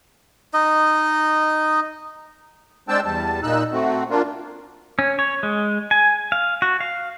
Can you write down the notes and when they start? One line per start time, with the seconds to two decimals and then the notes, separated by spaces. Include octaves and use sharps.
0.54 D#4 D#5
2.89 G#3 C4 D4 G5 A5 E6
3.05 E2 G3 A5
3.43 A#2 D#4 E6 F#6
3.72 A3 C4 F#4
4.10 A#3 D4 F4
4.99 C#4
5.19 C#5
5.43 G#3
5.91 G#5
6.32 F5
6.62 F#4
6.80 F5